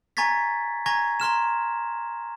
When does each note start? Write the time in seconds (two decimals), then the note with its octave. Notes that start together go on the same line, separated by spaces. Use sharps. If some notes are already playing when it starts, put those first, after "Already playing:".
0.17 G#5 A#5 C#6 G#6 A6 B6
0.86 G#5 A#5 C#6 G#6 A#6
1.20 A#5 C6 F6 E7